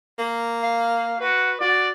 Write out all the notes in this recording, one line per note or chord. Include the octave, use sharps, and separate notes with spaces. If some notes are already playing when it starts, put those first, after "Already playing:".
A#3
F5
F#4 B4
F#4 D5